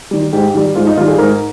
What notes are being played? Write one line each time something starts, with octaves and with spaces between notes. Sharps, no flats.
D#3 G3
G#2 G4
D#3 G3
G#2 F4
D#4
D#3 G3 F4
G#4
G#2 A#4